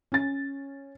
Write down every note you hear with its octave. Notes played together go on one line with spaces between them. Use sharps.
C#4 A6